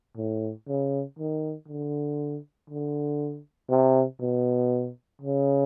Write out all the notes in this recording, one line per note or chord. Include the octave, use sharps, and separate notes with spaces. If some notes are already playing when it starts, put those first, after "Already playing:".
A2
C#3
D#3
D3
D3
C3
B2
C#3